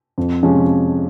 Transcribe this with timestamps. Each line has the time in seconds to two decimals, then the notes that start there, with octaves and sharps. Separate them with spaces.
0.18 F2
0.43 C3 F3 G#3 C#4